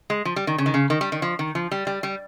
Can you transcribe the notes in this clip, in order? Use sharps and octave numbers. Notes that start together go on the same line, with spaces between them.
G#3
F3
G3
D#3
C#3
D#3
C#3
D#3
G3
D#3
F3
D#3
F3
G3
G3
G3